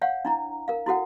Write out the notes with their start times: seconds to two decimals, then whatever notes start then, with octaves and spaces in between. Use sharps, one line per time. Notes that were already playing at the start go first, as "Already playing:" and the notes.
0.02 C#5 F5 F#5
0.25 D4 E4 A#5
0.68 A#4 F5
0.86 E4 F#4 A4 F#5